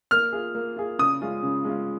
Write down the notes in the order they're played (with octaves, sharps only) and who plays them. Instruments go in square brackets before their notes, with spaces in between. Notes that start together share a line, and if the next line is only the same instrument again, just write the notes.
[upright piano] A#3 [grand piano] F6
[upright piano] F4 G#4
A#3
F4 G#4
[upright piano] C#3 [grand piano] D#6
[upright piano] G#3 C#4 F4
C#3
G#3 C#4 F4